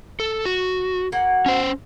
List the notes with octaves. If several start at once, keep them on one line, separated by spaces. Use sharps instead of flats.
A4
F#4
A#3 F#4 F#5
C#4 C5